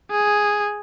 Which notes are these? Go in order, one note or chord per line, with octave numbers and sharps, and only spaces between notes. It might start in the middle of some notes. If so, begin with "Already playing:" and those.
G#4